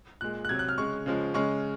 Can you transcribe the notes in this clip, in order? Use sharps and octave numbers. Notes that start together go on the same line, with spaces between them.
A#2 G#3 F#6
F#6
C3 F#3 G#6
F#6
F6
C#3 G#3 C#6
C#3 F3 G#3
C#3 G#3 C#6